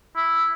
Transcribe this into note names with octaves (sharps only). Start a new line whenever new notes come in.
E4